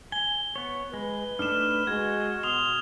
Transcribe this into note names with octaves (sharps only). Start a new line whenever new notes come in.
G#5 G7
B3 C#5
G#3 B4
A3 D4 D#4 F6 E7
G#3 F#4 G#6
B2 C6 D#6 F7 G7